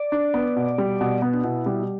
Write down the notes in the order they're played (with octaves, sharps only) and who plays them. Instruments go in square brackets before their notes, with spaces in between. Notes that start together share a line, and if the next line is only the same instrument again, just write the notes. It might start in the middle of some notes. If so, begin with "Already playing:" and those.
Already playing: [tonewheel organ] D5
[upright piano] D4
B3
B2
G3
B2
B3
[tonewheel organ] D4
[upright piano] B2 [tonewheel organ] E4
[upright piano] G3